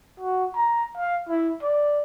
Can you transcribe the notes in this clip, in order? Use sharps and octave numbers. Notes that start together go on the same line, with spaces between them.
F#4
A#5
F5
E4
D5